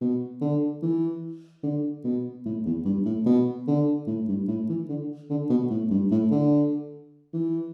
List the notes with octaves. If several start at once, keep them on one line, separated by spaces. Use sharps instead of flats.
B2
D3
E3
D3
B2
A2
E2
G2
A2
B2
D3
A2
G2
A2
E3
D3
D3
B2
A2
G2
A2
D3
E3